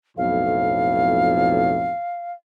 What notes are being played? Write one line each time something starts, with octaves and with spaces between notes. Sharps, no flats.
B1 F2 A2 F5